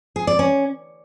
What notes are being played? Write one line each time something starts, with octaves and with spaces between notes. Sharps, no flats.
G#4
D5
C#4